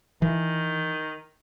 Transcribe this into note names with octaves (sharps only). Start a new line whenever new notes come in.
D#3 E3